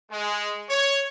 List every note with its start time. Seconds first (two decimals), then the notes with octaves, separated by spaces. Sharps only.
0.10 G#3
0.69 C#5